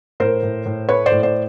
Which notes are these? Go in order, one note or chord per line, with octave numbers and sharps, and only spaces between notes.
A2 A#4 C5
A2
A2
A3 B4 C#5
C5 D5
A2
C5 D5